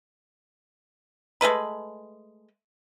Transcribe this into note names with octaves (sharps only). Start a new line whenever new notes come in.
G#3 A3 B4 B5